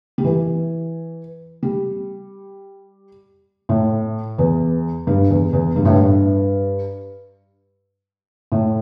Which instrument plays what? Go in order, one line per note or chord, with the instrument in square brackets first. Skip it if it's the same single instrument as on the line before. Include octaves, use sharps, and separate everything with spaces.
[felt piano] G3
E3
G3
A2
E2
G2
E2
E2
G2
A2
G2
A2